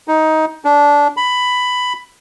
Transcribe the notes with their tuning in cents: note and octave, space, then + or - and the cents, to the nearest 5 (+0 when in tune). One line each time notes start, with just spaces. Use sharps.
D#4 +15
D4 -15
B5 +10